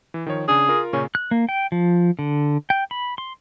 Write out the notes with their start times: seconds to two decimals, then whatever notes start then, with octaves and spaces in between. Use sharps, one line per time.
0.14 E3
0.26 D#3 F3 C#5
0.48 C#3 D4 G#4
0.68 F4 A#4
0.93 A#2 C#3 C#4
1.15 F#6
1.31 A#3
1.49 G5
1.72 F3
2.19 D3
2.70 G5
2.91 B5
3.18 C6